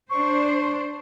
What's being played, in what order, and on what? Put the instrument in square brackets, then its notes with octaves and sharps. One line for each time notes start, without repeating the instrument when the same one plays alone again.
[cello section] D4 C5 [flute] C#6